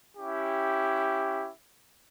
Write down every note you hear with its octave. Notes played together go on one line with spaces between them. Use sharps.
C#4 E4 G4